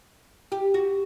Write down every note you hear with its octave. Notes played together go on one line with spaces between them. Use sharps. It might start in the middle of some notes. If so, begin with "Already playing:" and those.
G4
F#4